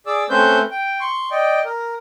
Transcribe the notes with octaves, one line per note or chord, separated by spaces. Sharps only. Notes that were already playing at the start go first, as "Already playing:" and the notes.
G#4 D5 D6 E6
A3 C4 C#4 B4 C5 G6
G5
C6 C#6
D5 D#5 G5
A#4